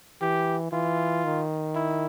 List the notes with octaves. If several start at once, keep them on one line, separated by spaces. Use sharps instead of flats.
E3 G4
E3 F4
D#3
E4